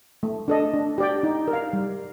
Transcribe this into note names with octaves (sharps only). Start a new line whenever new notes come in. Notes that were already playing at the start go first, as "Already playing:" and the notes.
A3
D4 A4 D#5
D4
G4 D5 G5
D#4
A#4
F5
G3